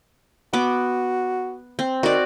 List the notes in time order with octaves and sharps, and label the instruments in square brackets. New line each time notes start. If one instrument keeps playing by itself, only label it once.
[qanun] B3 D6 [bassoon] F#4
[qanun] C4
[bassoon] D#3 [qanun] F#4 D5